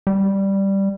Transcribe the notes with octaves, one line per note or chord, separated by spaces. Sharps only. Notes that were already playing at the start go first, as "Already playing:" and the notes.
G3